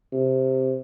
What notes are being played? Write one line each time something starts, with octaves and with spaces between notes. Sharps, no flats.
C3